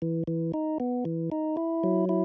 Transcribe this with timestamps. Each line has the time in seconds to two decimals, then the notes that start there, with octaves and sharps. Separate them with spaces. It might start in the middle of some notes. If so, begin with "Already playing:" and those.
0.02 E3
0.27 E3
0.54 D#4
0.80 B3
1.05 E3
1.32 D#4
1.57 E4
1.84 F#3
2.09 E4